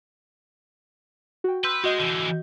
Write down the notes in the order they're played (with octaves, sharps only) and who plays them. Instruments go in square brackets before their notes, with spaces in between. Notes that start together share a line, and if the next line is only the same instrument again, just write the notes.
[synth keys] F#4 G5
[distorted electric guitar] B4 [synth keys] C6 E6 G6
[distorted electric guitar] G#3 [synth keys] F#4 D#5 G6
[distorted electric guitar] D3 E3